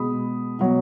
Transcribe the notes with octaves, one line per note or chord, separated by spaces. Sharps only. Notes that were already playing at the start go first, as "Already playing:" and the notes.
Already playing: B2 G#3 B5 D#6
B2 F#3